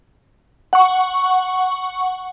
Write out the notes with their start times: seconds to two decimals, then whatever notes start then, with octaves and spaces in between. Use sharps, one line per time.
0.73 F#5 C#6